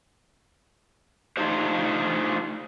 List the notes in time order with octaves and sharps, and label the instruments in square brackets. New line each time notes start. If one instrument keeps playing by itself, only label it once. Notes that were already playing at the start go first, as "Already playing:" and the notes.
[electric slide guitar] A3 D4 D#4 F4 G4 C5